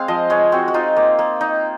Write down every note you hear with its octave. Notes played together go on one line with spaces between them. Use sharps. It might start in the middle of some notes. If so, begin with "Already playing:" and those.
Already playing: G#3 C4 F5
F3 D#5
G#3 C#5
C4 F#4
F#4
D#4 F4
A#3
A#3
D#4